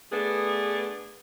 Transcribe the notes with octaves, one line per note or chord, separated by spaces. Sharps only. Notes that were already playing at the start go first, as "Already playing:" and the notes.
A3 B3 D4 G#4 B4